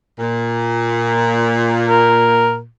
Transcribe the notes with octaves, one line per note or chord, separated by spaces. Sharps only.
A#2
A#4